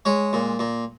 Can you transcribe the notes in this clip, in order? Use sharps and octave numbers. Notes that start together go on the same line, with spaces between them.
G#3 C#5
A#2
A#2